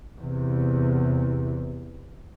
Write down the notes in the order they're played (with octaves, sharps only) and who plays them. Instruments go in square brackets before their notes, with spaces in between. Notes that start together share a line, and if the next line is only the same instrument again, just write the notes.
[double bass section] E2 C3